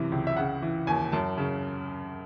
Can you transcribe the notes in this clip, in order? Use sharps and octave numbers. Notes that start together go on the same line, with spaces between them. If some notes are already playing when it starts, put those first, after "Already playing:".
Already playing: F#2 C3 E3
C#2
E5
C#3 F#5
E3
D#2 G#5
F#2 A5
C#3